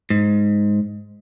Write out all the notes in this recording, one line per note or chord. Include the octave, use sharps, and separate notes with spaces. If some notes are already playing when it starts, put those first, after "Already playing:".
G#2